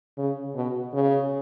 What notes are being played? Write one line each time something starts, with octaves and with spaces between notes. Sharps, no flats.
C#3
B2
C#3